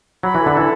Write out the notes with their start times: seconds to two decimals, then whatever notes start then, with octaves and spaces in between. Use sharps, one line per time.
0.23 F#3 B5
0.35 E3 A4
0.46 D3
0.53 E3 A4